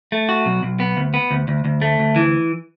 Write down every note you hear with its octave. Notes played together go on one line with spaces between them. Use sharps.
A3
F#4
B1
B1
B3
D2
B3
D2
D2
D2
A3
D2
E3